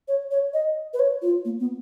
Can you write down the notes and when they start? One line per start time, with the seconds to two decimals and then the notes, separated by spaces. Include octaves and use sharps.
0.08 C#5
0.31 C#5
0.54 D#5
0.94 B4
0.99 C#5
1.22 F4
1.45 A#3
1.60 B3